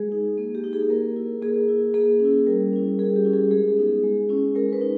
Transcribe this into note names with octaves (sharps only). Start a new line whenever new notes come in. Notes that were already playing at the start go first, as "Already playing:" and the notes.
Already playing: G#3 G#4
D#4
A#3
G4
D#4
G#4
A#3 A#4
E4
A#3 G#4
E4
A#3 G#4
C#4
E4
G3 A#4
C#4 E4
G3 G#4
G4
C#4 E4
G#4
G#3 G#4
B3 D#4
G#3
C#4 E4
G#3 A#4
B4
D#4